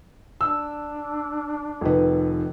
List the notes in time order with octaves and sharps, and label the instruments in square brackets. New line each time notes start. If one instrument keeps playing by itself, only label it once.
[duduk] D4 [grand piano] E6
[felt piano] F1 D#3 B4